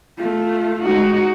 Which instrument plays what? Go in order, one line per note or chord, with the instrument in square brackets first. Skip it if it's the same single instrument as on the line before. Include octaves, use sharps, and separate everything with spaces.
[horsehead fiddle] A3 F4
[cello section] G#3 D#4 F#4